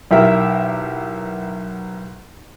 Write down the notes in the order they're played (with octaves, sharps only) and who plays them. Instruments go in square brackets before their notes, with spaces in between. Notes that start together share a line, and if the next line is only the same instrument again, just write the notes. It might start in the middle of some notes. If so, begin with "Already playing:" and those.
[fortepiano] B1 E4 G4 A#4 E5